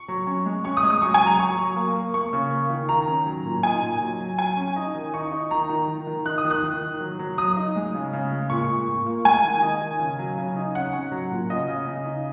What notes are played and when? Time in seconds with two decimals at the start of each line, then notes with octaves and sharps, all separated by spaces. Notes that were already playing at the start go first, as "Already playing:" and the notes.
Already playing: C#6
0.08 F#3
0.27 C#4
0.46 G#3
0.64 C#4 C#6
0.77 D#6
0.83 G#3
0.90 D#6
1.02 F#3 C#6
1.14 G#5
1.20 F#3
1.26 A#5
1.39 F#3 C#6
1.57 F#3
1.76 A#3
1.96 A#3
2.14 A#3 C#6
2.33 C#3
2.51 A#3
2.70 D#3
2.89 D#3 A#5
3.07 C#4
3.26 F#3
3.45 A#2
3.63 D#4 G#5
3.82 A#2
4.01 F#3
4.20 F#3
4.38 F#3 G#5
4.57 C#4
4.76 D#4
4.95 D#3
5.13 D#4 C#6
5.32 D#4
5.51 D#3 A#5
5.69 D#3
5.88 D#3
6.07 D#3
6.26 D#4 F#6
6.38 D#6
6.44 D#3
6.51 F#6
6.63 D#3
6.81 D#3
7.01 F#3
7.19 F#3
7.38 F#3 D#6
7.57 D#4
7.76 G#3
7.94 C#3
8.13 C#3
8.31 G#3
8.50 A#2 C#6
8.69 A#2
8.88 A#2
9.06 A#3
9.25 G#3 G#5
9.44 D#3
9.62 D#4
9.82 D#3
9.99 C#3
10.19 F#3
10.38 C#3
10.56 D#4
10.75 C#4 F#5
10.93 C#4
11.12 F#3
11.31 A#2
11.50 C#3 D#5
11.68 C#3
11.87 C#3
12.06 D#4